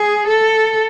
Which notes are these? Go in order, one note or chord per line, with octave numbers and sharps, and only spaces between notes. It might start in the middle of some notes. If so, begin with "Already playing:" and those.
Already playing: G#4
A4